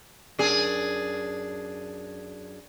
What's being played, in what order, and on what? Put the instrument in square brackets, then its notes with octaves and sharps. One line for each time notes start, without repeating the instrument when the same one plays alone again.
[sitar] F#2 D4 G#4